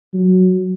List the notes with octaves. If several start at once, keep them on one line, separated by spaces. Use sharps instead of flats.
F#3